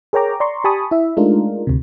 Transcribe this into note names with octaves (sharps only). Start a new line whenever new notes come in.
G#4 A#4 C#5 G5 A#5 D6
D5 A#5 C6 C#6
G4 G#5 A5 B5 C#6 D#6
E4 E5
G#3 A3 D4 D#4 F4 A#4
D2 C3